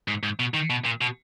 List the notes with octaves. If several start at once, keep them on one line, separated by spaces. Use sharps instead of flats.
G#2
G#2
B2
D#3
B2
A#2
B2